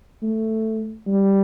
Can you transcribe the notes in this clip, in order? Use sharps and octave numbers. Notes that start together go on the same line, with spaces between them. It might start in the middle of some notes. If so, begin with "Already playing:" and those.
A3
G3